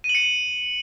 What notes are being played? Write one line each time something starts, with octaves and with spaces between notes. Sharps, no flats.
D#7
F#7
C#7